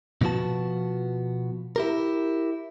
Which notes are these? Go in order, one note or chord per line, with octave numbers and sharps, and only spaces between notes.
B2 F3 B3 F#4 A5
E4 G4 A#4